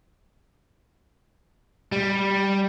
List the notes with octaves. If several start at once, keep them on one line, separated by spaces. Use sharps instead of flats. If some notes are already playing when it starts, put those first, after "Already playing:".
G3